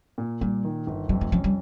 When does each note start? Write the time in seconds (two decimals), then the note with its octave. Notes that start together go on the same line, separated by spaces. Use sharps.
0.18 A#2
0.41 A#2 G3
0.64 D#3
0.87 G1
1.09 F2 G3
1.21 G#3
1.32 F3 C#4
1.44 G3